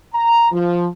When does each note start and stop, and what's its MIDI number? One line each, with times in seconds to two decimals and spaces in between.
0.14 0.48 82
0.52 0.87 53